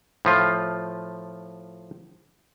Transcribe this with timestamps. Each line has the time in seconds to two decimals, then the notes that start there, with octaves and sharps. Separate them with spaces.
0.25 A2 F3 F4